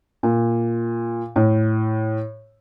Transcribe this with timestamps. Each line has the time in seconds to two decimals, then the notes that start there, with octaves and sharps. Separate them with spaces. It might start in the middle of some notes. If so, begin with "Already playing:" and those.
0.23 A#2
1.36 A2